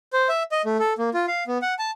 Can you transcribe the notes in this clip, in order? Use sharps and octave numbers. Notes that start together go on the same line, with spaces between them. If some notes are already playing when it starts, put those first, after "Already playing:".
C5
E5
D#5
A3
A4
A#3
F4
F5
B3
F#5
A5